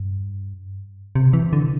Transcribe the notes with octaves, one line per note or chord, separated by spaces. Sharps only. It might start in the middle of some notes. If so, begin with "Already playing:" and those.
Already playing: G2
C3
E3
D3